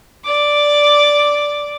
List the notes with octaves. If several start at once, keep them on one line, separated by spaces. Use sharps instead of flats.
D5 D6